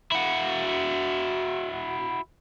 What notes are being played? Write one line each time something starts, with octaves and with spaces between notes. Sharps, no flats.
E4 F#4